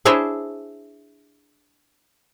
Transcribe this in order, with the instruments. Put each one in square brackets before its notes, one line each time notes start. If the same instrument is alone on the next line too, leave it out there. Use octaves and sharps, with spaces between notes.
[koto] D4 E4 G#4 C5 C#5 E5